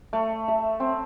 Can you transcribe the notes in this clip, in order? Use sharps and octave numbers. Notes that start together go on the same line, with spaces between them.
A3
E5
C4